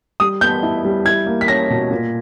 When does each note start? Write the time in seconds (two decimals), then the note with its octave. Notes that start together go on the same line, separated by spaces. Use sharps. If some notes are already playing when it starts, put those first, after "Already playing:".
0.20 G3 D#6
0.41 B3 G6
0.63 E4
0.85 G3
1.05 E4 G#6
1.26 A#3
1.41 B6
1.48 C#4 A#6
1.70 B2
1.91 A#2